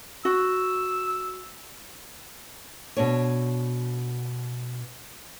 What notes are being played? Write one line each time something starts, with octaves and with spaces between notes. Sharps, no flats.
F#4 E6
B2 D4 C#5